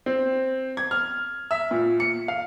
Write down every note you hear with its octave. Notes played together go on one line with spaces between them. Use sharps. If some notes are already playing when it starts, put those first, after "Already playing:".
C4
G#6
F6
E5
A#2
C#7
F5